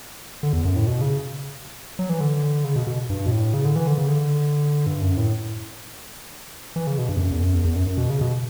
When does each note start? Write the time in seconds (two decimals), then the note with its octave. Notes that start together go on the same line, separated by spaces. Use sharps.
0.43 D3
0.53 E2
0.65 F#2
0.76 A2
0.87 B2
1.01 C#3
1.99 F#3
2.09 E3
2.20 D3
2.64 C#3
2.76 B2
2.87 B2
3.10 G2
3.26 B2
3.31 A2
3.54 C#3
3.65 D3
3.75 E3
3.87 D3
3.98 C#3
4.08 D3
4.87 G2
5.02 F#2
5.17 A2
6.76 E3
6.87 C#3
6.98 B2
7.09 G2
7.16 E2
7.20 F#2
7.31 E2
7.43 F#2
7.54 E2
7.64 E2
7.76 F#2
7.87 F#2
7.98 B2
8.10 C#3
8.21 B2